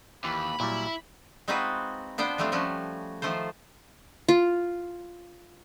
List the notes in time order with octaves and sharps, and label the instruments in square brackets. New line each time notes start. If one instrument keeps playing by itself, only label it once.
[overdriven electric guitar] D#2 [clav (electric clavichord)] E3 [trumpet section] B5
[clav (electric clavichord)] A#2 F#3 G3 [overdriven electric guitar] E4
[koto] G#3 C4 D#4 F4 F#4 B4
B3 D4 F4 C5 G5
F3 G3 A3 C4 D4
F3 G3 A3 C#4 F#4
D#3 F3 A3 F4 C5
[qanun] F4